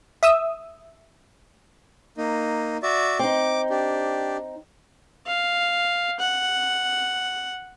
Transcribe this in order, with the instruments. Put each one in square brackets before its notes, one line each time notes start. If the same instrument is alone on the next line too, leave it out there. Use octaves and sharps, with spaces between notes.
[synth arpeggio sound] E5 D#6 E6
[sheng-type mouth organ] A#3 D#4
F#4 D5 E5
[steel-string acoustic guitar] C4 D#4 [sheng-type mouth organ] D6
[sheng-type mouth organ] D4 G4
[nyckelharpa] F5
F#5